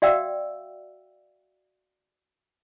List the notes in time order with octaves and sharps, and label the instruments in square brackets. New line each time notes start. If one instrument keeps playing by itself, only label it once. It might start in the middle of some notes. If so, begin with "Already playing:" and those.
[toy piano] F#4 D5 E5 F5 G5 E6